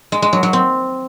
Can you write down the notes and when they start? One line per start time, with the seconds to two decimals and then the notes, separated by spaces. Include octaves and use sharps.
0.12 G#3
0.22 G#3
0.33 F#3
0.43 F#3
0.53 C4